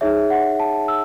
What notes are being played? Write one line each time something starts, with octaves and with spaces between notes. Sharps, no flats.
D#4 G#4 C#5 E5
F#5
A5
E6